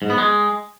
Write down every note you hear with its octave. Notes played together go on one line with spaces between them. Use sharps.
G#2
B3
G#3